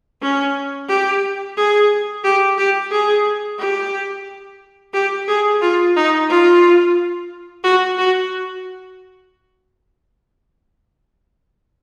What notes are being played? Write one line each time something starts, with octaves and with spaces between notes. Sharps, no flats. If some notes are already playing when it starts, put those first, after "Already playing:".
C#4
G4
G#4
G4
G4
G#4
G4
G4
G#4
F4
D#4
F4
F#4
F#4